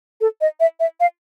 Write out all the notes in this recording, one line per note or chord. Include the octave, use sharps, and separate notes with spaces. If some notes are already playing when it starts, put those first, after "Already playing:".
A4
D#5
E5
E5
F5